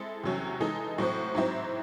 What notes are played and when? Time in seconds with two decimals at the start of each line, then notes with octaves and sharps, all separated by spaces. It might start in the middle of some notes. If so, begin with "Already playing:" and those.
Already playing: G#3 C4 E4 A4
0.24 E2 C3 F#3 C#4 F#4
0.60 E3 G#3 D#4 A4 D#5
0.98 A2 F#3 C4 F#4 C5
1.35 G#2 F#3 C4 E4 C5